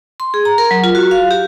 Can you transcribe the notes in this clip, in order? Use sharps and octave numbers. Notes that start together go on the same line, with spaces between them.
C6
G#4
A#5
A#4
F#3
F4
F#4
F5
G4